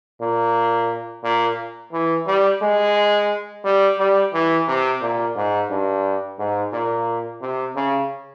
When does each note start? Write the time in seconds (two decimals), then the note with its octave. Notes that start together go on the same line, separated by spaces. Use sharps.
0.21 A#2
1.24 A#2
1.92 E3
2.27 G3
2.62 G#3
3.64 G3
3.99 G3
4.33 E3
4.68 C3
5.02 A#2
5.36 G#2
5.70 G2
6.39 G#2
6.73 A#2
7.42 C3
7.76 C#3